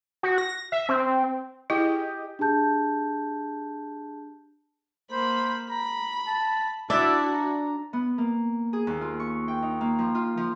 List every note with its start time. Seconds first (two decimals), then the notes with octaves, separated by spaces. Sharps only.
0.23 F#4
0.38 A#6
0.72 E5
0.89 C4
1.70 E4 G4 G#4 D#5
2.39 D4 G4 G#4 A5 G6
5.11 A#3 C5 B5
5.69 A#5 B5
6.27 A5
6.90 D4 E4 F#4 D5 E5
7.33 A#5
7.93 B3
8.18 A#3
8.73 G#4
8.87 D#2
9.01 F4
9.20 C#6
9.48 G5
9.62 D#4
9.81 A#3
9.99 F3
10.15 F4
10.37 F3